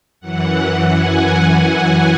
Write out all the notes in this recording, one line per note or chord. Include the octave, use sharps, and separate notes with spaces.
F#2 E3 F#5
G#5